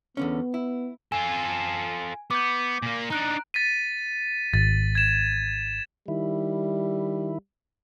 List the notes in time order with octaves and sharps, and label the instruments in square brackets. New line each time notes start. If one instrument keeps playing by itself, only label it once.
[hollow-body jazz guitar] E2 D3 C#4 [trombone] B3
[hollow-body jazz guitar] E4
[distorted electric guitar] F4 A4 [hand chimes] G#5
[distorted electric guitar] B3 [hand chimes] D6 G6
[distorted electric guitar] A#2 A#3
[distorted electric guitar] D4 D#4 [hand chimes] A#5 F#6 D7
[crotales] A6 B6 D#7
[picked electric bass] G#1 [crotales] A6
[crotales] G#6 E7
[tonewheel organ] D#3 E4 [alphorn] G3